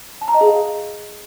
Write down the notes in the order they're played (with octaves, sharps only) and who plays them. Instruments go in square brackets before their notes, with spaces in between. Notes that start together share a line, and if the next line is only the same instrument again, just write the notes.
[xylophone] A5
A#5
D#5
G#4
F5